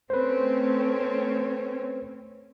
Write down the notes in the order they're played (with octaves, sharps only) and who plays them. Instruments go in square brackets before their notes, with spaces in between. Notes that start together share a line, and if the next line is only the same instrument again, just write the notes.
[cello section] A3 C4 C#4 [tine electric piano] B4 C5